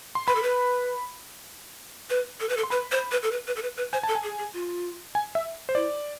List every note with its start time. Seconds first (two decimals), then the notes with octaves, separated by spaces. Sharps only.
0.15 C6
0.27 B4 B5
0.35 A4
0.43 B4
2.10 B4
2.40 A4
2.49 B4
2.57 A4
2.63 C6
2.70 B4 B5
2.91 C5
3.11 B4
3.23 A4
3.32 B4
3.47 B4
3.56 A4
3.62 B4
3.77 B4
3.93 C5 G#5
4.03 A4 A5
4.15 G#5
4.23 G#4
4.39 G#4
4.53 F4
5.15 G#5
5.35 E5
5.69 C5
5.75 E4 D5